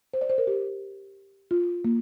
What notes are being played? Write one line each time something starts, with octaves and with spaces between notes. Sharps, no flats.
C5
D5
C5
A#4
G4
F4
A#3